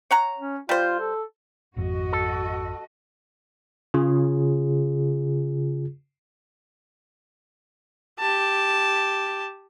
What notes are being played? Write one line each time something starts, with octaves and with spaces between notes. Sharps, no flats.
C#5 F#5 A#5
C#4
G3 F4 C5
A4
G#1 F2 F#4 D#5
A4
C#3 F4 G#4
G4 A5